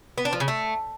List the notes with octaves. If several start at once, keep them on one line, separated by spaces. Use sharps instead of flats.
B3
D4
F3
C#3
A3